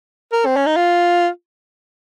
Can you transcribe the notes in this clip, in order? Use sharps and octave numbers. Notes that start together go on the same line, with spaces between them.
A#4
C4
C#4
D#4
F4